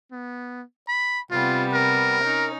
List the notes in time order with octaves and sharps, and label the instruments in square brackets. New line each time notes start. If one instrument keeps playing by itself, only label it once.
[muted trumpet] B3
B5
[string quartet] C3 G3 B3 [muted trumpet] F4
[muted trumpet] A#4
[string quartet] C#4 D#4